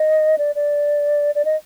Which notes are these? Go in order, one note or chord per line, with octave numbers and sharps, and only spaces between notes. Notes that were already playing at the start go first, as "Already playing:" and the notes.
Already playing: D#5
D5
D5
D5
D#5